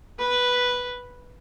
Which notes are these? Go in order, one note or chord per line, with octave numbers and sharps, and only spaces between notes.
B4